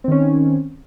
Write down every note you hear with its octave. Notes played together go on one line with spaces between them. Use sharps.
D#3 C4 C#4